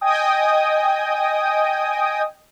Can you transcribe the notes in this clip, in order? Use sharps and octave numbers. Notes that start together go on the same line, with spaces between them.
D#5 G5 G#5 D#6